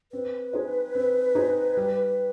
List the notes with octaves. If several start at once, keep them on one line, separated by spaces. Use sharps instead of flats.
C4 B4
D#4 G#4 C5
C4
D#4 G#4 C5
G3